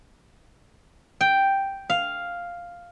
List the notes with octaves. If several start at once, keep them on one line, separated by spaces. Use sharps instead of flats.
G5
F5